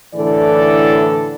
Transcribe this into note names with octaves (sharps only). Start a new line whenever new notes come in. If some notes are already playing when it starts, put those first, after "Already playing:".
A2 D3 E3 A4 D5